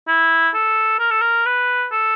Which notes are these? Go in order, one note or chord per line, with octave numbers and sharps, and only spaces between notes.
E4
A4
A#4
A4
A#4
B4
A4